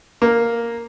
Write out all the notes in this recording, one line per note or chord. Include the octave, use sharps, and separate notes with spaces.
A#3